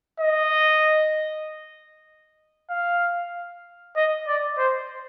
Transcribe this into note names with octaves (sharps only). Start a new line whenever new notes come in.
D#5
F5
D#5
D5
C5